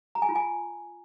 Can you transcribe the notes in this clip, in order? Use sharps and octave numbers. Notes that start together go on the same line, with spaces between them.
A#5
G#5
F4
G#5